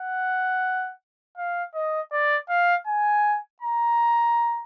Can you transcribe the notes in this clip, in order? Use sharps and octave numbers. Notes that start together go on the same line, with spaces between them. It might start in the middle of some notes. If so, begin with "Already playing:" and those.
Already playing: F#5
F5
D#5
D5
F5
G#5
A#5